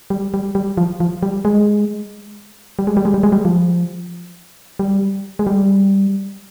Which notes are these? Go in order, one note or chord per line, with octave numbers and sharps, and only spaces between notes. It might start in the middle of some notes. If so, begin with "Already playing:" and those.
G3
G3
G3
F3
F3
G3
G#3
G3
G#3
G3
G#3
G3
G#3
G3
F3
G3
G#3
G3